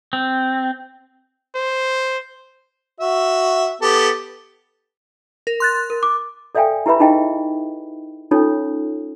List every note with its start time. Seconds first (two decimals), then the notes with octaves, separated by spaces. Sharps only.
0.13 C4
1.56 C5
3.00 F#4 E5
3.82 B3 G4 A4
5.47 A#4
5.60 C6 F#6 A6
5.90 A#4
6.03 D6
6.55 A4 D5 E5 F5 G5 G#5
6.86 E4 G4 B4 E5 B5
7.00 D#4 E4 G#4 D#5 F5 G5
8.31 C#4 D#4 F4 A4 C#5